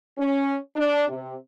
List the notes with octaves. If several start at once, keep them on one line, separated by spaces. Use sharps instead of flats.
C#4
D4
C3